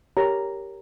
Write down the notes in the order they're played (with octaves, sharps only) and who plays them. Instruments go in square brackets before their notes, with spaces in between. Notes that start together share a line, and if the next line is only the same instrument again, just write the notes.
[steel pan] G4 A#4 C#5 A#5